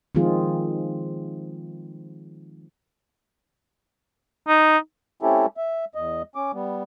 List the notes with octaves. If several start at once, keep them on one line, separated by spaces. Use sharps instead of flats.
D#3 F3 G#3 C4 F4 G#4
D#4
A3 C4 C#4 E4 G4 A4
E5
E2 D#5
C#4 D6
G3 B3